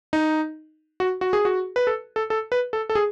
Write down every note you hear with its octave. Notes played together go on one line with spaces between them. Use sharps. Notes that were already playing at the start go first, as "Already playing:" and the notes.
D#4
F#4
F#4
G#4
F#4
B4
A4
A4
A4
B4
A4
A4
G#4